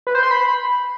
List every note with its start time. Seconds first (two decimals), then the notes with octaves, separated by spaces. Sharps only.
0.07 B4
0.15 C5
0.23 C6
0.31 B5